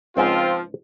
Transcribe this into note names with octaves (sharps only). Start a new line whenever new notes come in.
C#2 G#2 F3 G#3 C4 F4